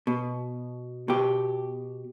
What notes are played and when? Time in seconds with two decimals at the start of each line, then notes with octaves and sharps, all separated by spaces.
0.07 B2
1.08 B2 G4